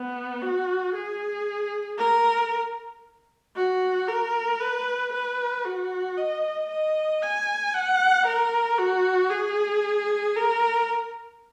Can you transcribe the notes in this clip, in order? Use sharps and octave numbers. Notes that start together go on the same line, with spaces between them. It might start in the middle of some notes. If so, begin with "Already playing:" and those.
Already playing: B3
F#4
G#4
A#4
F#4
A#4
B4
B4
F#4
D#5
D#5
G#5
F#5
A#4
F#4
G#4
A#4